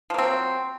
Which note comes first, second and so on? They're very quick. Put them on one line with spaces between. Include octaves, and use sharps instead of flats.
F3 A#3 C4 F#3